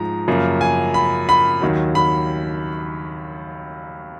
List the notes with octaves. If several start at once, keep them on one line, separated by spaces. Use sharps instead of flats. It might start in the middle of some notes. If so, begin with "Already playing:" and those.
Already playing: G#2 F3 G#3 A#5
F#2 C#3 F3 A#3
G#5
B5
B5
D#2 D#3 F#3
B5